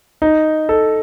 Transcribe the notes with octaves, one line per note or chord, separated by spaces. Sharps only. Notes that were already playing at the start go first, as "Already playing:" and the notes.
D#4
A4